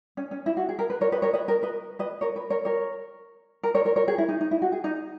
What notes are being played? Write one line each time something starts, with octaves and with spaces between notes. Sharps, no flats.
C#4
C#4
E4
F#4
G#4
A#4
B4
A#4 C#5
B4 D#5
A#4 C#5
B4 D#5
A#4 C#5
B4 D#5
B4 D#5
A#4 C#5
B4
A#4 C#5
A#4 C#5
A#4
A#4 C#5
A#4 C#5
A#4 C#5
G#4
E4
D#4
D#4
E4
F#4
G#4
D#4